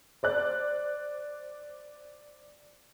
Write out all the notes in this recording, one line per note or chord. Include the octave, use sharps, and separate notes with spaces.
C5 D5 F#6